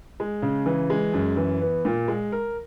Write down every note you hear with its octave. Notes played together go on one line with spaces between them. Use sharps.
G#3
C#3
E3
G#3
F#2
E3
B3
A#2
G#3
A#4